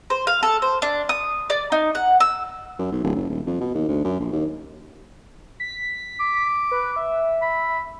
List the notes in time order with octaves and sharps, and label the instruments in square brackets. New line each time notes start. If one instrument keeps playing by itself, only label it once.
[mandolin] C5
F5
A4
C5
D4
D#6
D5
D#4
F#5
E6
[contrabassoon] F#2
B1
D1
F#1
D#1
F2
B2
D#2
D2
F#2
A#1
D#2
[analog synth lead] B6
[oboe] D6
[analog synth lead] B4
E5
[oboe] B5